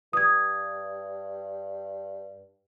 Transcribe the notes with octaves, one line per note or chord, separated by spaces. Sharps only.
G2 D#6 G#6